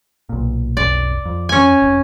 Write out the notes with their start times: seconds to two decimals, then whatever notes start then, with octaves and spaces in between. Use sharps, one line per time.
0.29 B1 A#2
0.77 F1 B1 D5
1.25 F2
1.49 C#4 G#5
1.82 F1